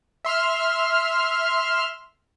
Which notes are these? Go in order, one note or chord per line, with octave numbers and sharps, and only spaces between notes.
E5 C6 F6